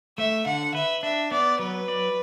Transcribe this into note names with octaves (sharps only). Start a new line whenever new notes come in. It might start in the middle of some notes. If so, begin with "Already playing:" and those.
A3 E5
D3 F#5
B4 E5
D4 E5
B3 D5
F#3 B4
D5